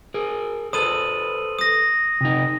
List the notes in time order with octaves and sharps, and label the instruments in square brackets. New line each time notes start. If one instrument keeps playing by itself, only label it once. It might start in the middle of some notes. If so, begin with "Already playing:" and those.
[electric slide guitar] G#4 A#4
[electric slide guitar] A4 B4 C5 [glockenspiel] D#6 D#7 F#7
[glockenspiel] D#6 A#6
[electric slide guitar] C3 D#4